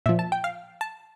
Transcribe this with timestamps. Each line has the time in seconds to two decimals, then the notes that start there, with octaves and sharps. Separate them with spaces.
0.06 A#2 F3 E5
0.19 A5
0.32 G5
0.44 F5
0.81 A5